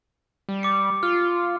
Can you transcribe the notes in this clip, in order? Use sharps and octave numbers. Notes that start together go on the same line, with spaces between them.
G3
D6 C#7
F4 F6